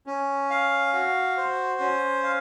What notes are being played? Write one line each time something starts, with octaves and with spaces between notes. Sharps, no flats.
C#4
F5
F#4
C5
C#4
F5